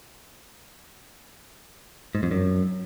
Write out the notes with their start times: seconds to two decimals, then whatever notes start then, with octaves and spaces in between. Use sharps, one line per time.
2.15 G#2
2.23 F2
2.31 F#2